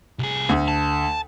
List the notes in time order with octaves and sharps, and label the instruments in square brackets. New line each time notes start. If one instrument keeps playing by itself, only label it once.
[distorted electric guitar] C2 G#4
[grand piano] D2
[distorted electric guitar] A5